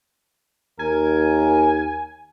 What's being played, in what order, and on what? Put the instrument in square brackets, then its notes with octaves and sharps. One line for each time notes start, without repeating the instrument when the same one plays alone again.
[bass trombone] D#2 [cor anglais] A#4 [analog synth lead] G#5